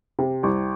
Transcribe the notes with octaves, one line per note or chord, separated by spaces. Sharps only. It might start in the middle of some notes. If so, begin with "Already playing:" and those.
C3
C2